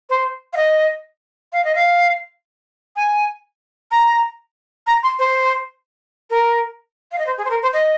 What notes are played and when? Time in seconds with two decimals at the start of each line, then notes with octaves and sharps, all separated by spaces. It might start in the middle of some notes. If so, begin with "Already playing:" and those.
0.09 C5
0.53 F5
0.57 D#5
1.52 F5
1.65 D#5
1.75 F5
2.96 G#5
3.91 A#5
4.87 A#5
5.03 C6
5.19 C5
6.30 A#4
7.12 F5
7.18 D#5
7.26 C5
7.38 G#4
7.45 C5
7.50 A#4
7.62 C5
7.73 D#5